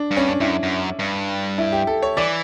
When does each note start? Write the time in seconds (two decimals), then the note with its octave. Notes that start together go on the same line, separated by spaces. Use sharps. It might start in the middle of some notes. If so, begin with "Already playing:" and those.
Already playing: D4
0.11 G2
0.17 C#4
0.28 D4
0.40 G2 E4
0.48 F#2
0.63 F#2
0.99 G2
1.58 E4
1.72 G4
1.87 A4
2.03 C#5
2.17 E3 D5